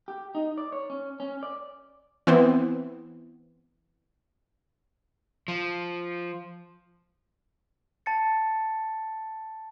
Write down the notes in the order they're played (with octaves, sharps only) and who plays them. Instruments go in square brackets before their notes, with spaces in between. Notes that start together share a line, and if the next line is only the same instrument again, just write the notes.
[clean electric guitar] G4
D#4
D5
C#5
C#4
C#4
D5
[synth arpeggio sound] E3 B3 C4
[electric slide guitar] F3
[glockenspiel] A5 A6 C#7